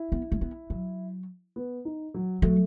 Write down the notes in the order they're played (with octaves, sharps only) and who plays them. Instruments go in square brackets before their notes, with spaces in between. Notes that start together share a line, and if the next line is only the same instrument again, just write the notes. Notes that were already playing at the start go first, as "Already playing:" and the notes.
Already playing: [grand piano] E4
[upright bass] B3
A3
B3
F#3
[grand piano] B3
D#4
F#3
[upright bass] F#3 [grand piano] A3